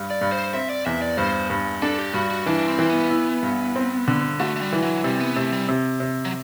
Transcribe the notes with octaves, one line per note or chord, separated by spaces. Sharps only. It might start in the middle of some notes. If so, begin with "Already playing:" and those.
Already playing: G2
D5
G2
C5
C4 E5
D5
E2 E5
D5
G2 C5
G2
D4 A4
G4
G2 F#4
F#4
E3 D4
C4
E3
B3
E4
G2
C4
D3
A3 F#4
A3
G3
E3
F#3
C3 G3
B3
C3 A3
G3
C3
C3
F#3